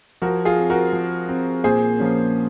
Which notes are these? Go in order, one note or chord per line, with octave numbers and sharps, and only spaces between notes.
F3 F#4 A#4
F4 G#4
C4
F#4 A#4
F3
C4
A#2 G#4 C5
F3 A#3 C#4